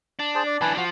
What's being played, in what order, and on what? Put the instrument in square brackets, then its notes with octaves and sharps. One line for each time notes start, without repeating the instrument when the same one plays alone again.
[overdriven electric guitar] D4
[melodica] G#4 C5 A5
D5
[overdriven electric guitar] E3 D4 [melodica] B4 G#5 A5
[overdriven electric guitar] F3 [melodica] F#4